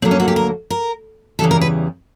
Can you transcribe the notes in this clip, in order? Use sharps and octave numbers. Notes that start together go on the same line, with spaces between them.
D2 D3 F#3 A#3 C4
C#4
F#4
G4
A#4
A#4
E2 C#3 E3 G3 A4
A#4
B4